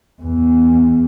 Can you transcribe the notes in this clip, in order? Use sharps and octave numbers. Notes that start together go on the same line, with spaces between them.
E2